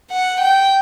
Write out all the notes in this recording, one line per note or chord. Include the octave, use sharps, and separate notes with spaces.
F#5
G5